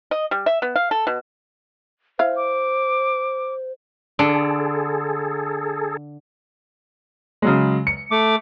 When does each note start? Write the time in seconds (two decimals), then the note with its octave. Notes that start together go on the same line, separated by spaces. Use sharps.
0.11 D#5
0.31 G3
0.46 E5
0.62 B3
0.76 F5
0.91 A4
1.07 B2
2.19 E4 C5 F5
2.37 D6
4.19 D3 G#4 A4
7.42 C#3 F#3 G#3
7.87 C#7
8.11 A3 D6